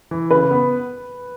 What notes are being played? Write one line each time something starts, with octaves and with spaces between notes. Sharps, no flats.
E3
C#3 B4
B3